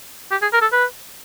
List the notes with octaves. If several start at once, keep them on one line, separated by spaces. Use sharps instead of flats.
G4
G#4
A#4
A4
B4